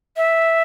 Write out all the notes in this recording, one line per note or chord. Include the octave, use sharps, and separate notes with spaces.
E5